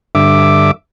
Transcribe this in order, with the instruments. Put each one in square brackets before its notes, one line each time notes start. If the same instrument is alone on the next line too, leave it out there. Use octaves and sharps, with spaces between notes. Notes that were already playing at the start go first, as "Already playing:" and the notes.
[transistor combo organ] G2 D3 E5 D6